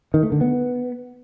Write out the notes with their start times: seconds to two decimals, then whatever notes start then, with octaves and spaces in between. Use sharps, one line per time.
0.14 D#3
0.23 A3
0.32 D3
0.41 B3